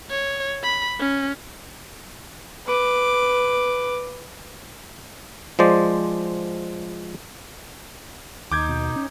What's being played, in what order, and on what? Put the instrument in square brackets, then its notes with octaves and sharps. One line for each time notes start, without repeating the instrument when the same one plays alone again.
[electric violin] C#5
B5
C#4
[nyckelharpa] B4 D6
[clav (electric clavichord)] F3 G#3 C5 D5
[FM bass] D#2 [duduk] D#4 [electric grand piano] D6 G6 G#6
[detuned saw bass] B2
C#4